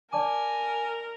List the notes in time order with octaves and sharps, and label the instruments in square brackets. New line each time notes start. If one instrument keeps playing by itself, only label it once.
[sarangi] A#4 [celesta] D5 A5 D6 [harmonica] G#5